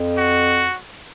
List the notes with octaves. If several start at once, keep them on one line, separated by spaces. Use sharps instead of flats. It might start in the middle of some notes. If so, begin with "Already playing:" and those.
Already playing: F2
F#4